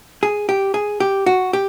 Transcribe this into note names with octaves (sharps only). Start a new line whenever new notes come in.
G#4
G4
G#4
G4
F#4
G4